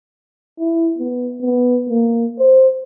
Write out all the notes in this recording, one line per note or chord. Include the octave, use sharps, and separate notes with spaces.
E4
B3
B3
A#3
C5